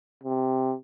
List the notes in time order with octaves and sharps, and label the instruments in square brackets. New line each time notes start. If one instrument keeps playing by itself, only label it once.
[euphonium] C3